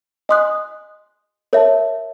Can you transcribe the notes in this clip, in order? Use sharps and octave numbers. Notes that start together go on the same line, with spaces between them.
D#5 G#5 C6 D#6 F#6
A#4 C#5 E5 A5